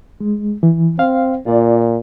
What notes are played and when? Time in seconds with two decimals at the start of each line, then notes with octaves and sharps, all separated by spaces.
0.20 G#3
0.63 E3
0.99 C4 F5
1.46 A#2 F4 D5